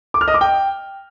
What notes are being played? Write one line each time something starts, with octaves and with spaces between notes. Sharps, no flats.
D6
F6
D#5
D6
G5